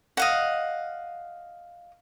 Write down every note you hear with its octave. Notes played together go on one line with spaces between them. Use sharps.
D#5 F5 F#5